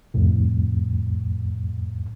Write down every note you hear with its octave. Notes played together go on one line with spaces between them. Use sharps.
C2 F2 A2